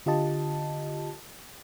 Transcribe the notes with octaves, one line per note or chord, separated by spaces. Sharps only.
D3 F4 G4 D#5 A5